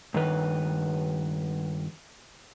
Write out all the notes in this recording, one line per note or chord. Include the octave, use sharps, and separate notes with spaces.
G2 D#3 B4